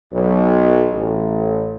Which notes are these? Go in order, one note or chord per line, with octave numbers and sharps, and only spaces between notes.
B1
A1